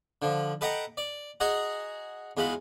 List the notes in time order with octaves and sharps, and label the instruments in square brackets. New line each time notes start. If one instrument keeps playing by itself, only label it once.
[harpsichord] D3 F3
A4 B4 D#5 F#5 G5 A#5
D5
F#4 G#4 D#5 F#5 A#5
E2 G#3 F4 F#4 B5